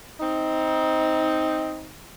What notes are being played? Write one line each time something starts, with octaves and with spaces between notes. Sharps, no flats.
C4 D#4